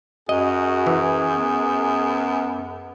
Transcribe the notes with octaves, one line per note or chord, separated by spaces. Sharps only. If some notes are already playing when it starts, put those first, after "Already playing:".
F#2 F#4 G#4 D#5
E3
B3